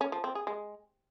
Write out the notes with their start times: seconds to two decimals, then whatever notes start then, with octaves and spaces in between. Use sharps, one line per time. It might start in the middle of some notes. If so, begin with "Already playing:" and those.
0.01 C#4
0.12 F3
0.24 C4
0.35 G#4
0.47 G#3